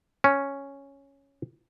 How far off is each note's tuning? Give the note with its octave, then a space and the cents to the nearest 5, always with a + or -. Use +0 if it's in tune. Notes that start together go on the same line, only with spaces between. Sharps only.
C#4 +0